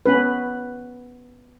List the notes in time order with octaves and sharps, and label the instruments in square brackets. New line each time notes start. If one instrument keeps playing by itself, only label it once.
[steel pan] B3 C#4 B4